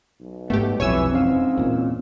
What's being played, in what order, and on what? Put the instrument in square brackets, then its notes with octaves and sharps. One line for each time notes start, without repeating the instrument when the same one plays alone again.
[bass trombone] B1
[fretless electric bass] G#2 B3 [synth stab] A3 G4
[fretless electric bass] E1 F2 [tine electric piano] B1 [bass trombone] E3 [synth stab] C#5 G#5 E6
[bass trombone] G#2 [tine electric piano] C4 C#4 F5
[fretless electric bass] E2 A#2